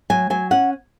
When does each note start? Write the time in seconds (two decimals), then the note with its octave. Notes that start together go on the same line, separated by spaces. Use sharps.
0.10 F#3 G#5
0.30 F#3 G#5
0.51 C#4 F#5